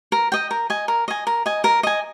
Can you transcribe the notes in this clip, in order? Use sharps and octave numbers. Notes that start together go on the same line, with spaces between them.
A#4
D#5 G5
A#4
D#5 G#5
A#4
D#5 G#5
A#4
D#5 G#5
A#4
D#5 G#5